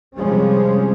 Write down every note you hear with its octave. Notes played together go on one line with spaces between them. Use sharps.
C3 F3 G3 G#3 C#4